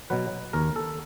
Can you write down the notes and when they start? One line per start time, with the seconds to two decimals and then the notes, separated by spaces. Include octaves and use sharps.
0.10 B2 F#3 B4
0.53 D#2 A#4
0.76 A4